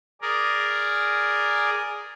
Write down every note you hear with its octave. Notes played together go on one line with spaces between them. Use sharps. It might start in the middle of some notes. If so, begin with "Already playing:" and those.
G#4 A#4 D5